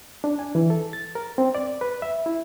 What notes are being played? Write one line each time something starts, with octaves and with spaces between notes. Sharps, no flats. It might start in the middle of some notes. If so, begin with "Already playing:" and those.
D4
G#5
E3
A4
A6
A#4
C4
D5
B4
E5
E4